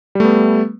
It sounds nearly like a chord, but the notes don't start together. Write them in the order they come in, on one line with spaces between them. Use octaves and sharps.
G3 A3 B3